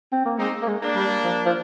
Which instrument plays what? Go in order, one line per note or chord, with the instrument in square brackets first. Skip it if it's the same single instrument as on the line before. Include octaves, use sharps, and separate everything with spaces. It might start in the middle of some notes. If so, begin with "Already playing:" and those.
[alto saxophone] C4
A#3
[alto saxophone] G#3 [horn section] C4 D#4
[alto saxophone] A#3
G#3
[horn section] A#3 D4
[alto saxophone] G3
F3
F3